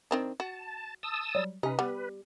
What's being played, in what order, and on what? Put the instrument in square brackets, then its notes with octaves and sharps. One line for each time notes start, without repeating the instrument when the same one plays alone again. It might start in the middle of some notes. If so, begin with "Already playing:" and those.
[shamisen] D#3 C4 D4
[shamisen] F#4 [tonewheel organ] A5
[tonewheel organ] A5 D#6 E6
[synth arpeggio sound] F#3 G3
[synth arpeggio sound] C3 C#4 [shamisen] D#4 [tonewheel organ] B4
[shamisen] G3 [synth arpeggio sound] B3